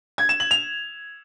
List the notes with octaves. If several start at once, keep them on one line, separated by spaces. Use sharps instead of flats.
G#6
E7
F#7
F7